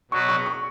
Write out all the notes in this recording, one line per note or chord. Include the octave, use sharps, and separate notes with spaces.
B2 F#3 B3 F#4 C#6
C#6
C#6